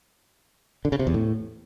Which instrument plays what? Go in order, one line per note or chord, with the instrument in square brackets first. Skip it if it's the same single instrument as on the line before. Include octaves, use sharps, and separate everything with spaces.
[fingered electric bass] D3
C#3
C3
E2
A2